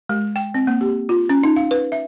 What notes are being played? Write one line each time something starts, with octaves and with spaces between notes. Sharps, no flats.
G#3
G5
C4
A#3
G4
F4
C#4
D#4
F5
B4
E5